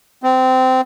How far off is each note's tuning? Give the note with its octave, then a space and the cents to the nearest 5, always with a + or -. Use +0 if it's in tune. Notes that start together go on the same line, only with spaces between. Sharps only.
C4 -20